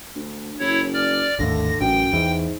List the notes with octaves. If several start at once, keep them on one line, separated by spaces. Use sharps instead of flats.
D2
F#1 E4 C#5
D5 F6
G#1 D#2 A2 D3 A#6
A1 F#2 G5
E2 G#2